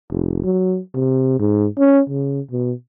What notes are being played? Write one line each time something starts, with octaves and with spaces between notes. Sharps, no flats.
F1
F#3
C3
G#2
C#4
C#3
B2